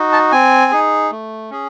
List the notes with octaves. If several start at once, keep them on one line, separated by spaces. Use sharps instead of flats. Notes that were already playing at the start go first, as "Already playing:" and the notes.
Already playing: D#4 F#4
A5
C4 G#5
D#4 G#4
A3
C#4 G#4